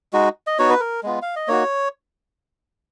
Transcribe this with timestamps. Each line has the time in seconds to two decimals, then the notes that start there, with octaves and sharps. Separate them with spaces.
0.13 G#3 D#4 F#4
0.47 D#5
0.59 B3 D#4 F#4 C#5
0.70 B4
0.80 A#4
1.03 G#3 B3 F4
1.22 F5
1.36 D#5
1.48 A#3 D#4 F#4 C#5